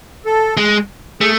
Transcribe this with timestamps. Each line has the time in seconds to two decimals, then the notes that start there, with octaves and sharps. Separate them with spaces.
0.26 A4
0.57 G#3
1.21 A3 G#4